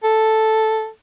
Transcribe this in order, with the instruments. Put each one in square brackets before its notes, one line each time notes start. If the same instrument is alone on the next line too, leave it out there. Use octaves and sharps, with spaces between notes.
[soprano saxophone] A4